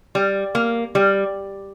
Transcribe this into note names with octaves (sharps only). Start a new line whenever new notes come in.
G3
A#3
G3